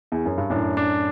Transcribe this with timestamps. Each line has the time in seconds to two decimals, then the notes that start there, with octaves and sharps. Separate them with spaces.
0.12 E2
0.26 F#2
0.38 G2
0.50 F#2 A2 D4
0.77 D4